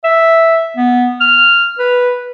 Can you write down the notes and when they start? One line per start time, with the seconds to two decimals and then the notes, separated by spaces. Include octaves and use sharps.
0.04 E5
0.77 B3
1.21 F6
1.79 B4